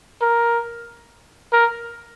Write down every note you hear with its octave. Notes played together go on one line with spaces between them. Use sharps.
A#4
A#4